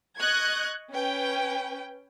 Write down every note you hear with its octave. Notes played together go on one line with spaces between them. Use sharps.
D#5 C#6 F#6 G#6
C#4 B4 G5